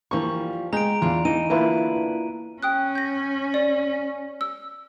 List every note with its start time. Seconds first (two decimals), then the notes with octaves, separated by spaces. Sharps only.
0.11 E3 F3 G3 A#3 C#6
0.73 G#3 G5 A#5 D7
1.02 E2 D4 F4
1.25 E3 D#4 D#7
1.50 D3 A3 A#3 E4 F4 B4
2.63 C#4 G5 D#6 F#6
2.95 G6 A#6
3.54 D5
4.41 E6